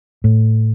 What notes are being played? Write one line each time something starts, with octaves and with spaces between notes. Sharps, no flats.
A2